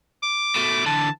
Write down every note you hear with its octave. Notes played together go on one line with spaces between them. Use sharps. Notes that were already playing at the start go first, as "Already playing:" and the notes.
D6
B2 A3
D3 E3 A5